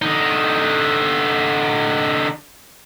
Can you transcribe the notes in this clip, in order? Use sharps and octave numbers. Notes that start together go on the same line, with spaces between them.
D3 D#4